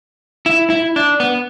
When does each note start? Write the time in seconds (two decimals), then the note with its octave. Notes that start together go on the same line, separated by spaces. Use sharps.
0.46 E4
0.70 E4
0.96 D4
1.20 B3